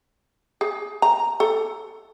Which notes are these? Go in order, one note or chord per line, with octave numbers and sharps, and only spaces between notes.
G#4
A#5
A4